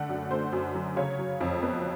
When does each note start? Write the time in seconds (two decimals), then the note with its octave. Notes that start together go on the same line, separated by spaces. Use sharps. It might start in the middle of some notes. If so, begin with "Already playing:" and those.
Already playing: D3 A3 F#5
0.09 F#2
0.31 A3 C5
0.52 F#2
0.75 F#3
0.97 C#3 C#5
1.19 F#3
1.41 F2
1.62 B3